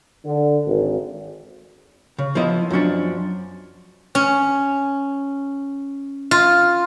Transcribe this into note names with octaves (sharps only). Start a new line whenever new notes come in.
D3
G#1
C#3
F3 B3 E4 D#5
F#2 F3 C#4 D4
C#4
F4